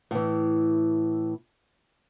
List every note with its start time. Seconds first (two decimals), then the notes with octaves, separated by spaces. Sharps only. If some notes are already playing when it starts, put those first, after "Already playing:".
0.11 A2 E3